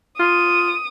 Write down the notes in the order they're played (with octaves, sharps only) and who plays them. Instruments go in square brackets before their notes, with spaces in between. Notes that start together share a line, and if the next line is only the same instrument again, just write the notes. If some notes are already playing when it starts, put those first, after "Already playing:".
[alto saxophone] F4 [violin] D#6